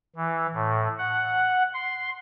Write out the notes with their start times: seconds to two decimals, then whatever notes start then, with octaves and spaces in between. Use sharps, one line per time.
0.16 E3
0.54 A2
0.98 F#5
1.74 C6